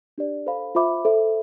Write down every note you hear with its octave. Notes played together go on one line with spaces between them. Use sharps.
D4 G4 D5
A4 C5 F5 B5
F4 C5 E5 B5 D6
A4 C5 E5